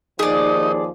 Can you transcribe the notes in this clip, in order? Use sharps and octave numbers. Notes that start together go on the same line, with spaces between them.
D#2 F3 D#4 G#4 D5